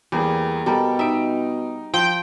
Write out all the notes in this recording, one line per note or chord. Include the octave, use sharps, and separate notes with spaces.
E2 G3 A#3 G#4
B2 G3 G4 A4 A#4
D#4 E5 D7
F3 G5